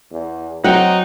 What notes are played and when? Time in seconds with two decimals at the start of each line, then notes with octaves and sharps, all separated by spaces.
0.12 E2
0.64 F#3 C4 D#4 F#5 G5